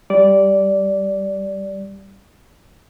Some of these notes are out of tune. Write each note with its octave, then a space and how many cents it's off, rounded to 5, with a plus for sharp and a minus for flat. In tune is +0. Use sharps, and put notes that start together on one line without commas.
G3 +0 D5 -10